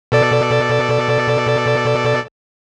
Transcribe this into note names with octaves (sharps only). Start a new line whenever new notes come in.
B2 A4 D5